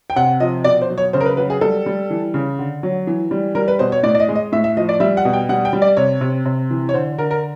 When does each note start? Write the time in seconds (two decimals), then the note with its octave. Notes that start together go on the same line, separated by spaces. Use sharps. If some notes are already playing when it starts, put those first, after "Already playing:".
0.10 G5
0.16 C3 F#5
0.40 F3 D#5
0.64 B2 D5
0.82 C5
0.90 F#3
0.98 C#5
1.13 C#3 C5
1.21 A#4
1.26 B4
1.37 F#3 B4
1.50 G#4
1.61 G3 A4
1.86 G3
2.10 E3
2.34 C#3
2.59 D3
2.83 F#3
3.07 E3
3.31 G3
3.55 G3 A#4
3.68 B4
3.79 B2 C5
3.92 C#5
4.03 A2 D5
4.15 D5
4.20 D#5
4.28 G#3
4.35 D#5
4.52 A2 E5
4.64 E5
4.77 F3 D#5
4.89 D5
5.00 G3 E5
5.17 F#5
5.25 B2
5.33 G5
5.49 G3 F#5
5.65 G5
5.73 G3
5.82 D5
5.97 C3 C#5
6.21 C3
6.45 C3
6.70 E3
6.89 C#5
6.94 D3 C5
7.18 D3 A#4
7.31 A#4